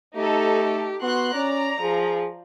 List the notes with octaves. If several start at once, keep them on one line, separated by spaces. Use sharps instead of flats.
A3 D#4 G4 A4
B3 F#4 C6 F#6
C#4 D5 A#5
F3 G#4